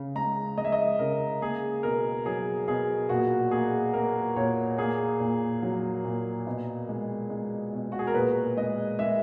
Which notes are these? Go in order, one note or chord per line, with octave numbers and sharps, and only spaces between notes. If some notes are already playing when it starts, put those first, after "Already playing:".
Already playing: C#3
G#3 A#5
G#3 D#5
E5
D#5
C#3 A#4
A#3 G#4
B2 A#4
F#3 G#4
B2 G#4
A#2 F#4
A#3 G#4
A#3 A#4
A#2 C#5
A#3 G#4
A#2
F#3
A#2
B2
G#3
G#3
B2
F#4
G#4
A#4
A#2 B4
G#3 D#5
G#3 E5